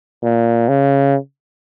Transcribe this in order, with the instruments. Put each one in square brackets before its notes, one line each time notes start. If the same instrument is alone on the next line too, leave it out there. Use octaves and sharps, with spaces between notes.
[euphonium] A#2
C#3